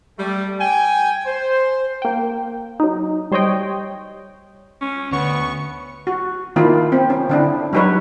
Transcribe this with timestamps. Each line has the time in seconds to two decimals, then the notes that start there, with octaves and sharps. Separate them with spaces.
0.18 G3 A3
0.60 G5 G#5
1.26 C5
2.02 A#3 G5
2.80 F#3 D#4
3.31 G3 C5 C#5 D#5 G5
4.81 C#4
5.12 D2 B3 C#5 C#6
6.07 F#4
6.56 D#3 A#3 E4 F4
6.92 C4
7.10 C#4
7.29 D3 D4 E4
7.73 F#3 G3 D#4 B4 C#5